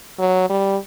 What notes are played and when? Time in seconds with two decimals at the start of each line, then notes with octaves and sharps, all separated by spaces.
0.19 F#3
0.49 G3